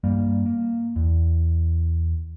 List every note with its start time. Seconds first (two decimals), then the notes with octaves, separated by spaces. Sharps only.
0.04 G2 G3 A#3
0.46 A#3
0.96 E2